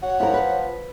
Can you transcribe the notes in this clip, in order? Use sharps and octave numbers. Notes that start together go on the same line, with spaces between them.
F#4 C#5 F#5
F3 E4 A#4
B4